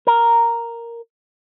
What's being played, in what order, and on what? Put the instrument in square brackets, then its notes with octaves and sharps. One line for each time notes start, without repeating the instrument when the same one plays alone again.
[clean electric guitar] A#4